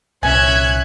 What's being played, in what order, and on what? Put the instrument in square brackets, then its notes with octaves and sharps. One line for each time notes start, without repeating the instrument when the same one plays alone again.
[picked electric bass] C2 A#2 [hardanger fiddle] C#4 E5 [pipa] G#5 [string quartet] F#6 G#6